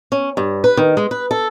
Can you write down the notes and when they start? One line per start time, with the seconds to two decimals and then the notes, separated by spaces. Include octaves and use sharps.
0.12 C#4
0.37 G2
0.64 B4
0.77 D#3
0.97 G#3
1.11 B4
1.31 A4